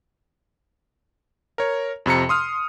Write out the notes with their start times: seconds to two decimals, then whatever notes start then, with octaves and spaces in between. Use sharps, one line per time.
1.58 A#4 C#5
2.06 F2 C3 A#5 C#7
2.29 C6 D#6 F6